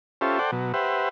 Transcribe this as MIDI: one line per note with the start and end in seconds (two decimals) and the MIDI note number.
0.21 0.39 61
0.21 0.39 65
0.21 0.39 67
0.21 0.39 69
0.21 0.39 72
0.21 0.39 76
0.39 0.51 69
0.39 0.51 72
0.39 0.51 74
0.39 0.51 78
0.39 0.51 79
0.52 0.72 47
0.52 0.72 54
0.74 1.09 67
0.74 1.09 71
0.74 1.09 72
0.74 1.09 76
0.74 1.09 78